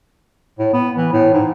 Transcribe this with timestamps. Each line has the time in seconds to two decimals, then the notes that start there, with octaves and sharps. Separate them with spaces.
0.59 A2
0.73 B3
0.97 E3
1.13 A2
1.33 G#2